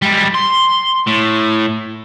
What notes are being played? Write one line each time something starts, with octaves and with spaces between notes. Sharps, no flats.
G3 G#3
C6
A2